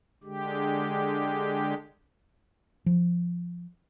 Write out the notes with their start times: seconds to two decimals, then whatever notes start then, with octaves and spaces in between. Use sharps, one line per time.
0.24 D3 G#3 G4
2.86 F3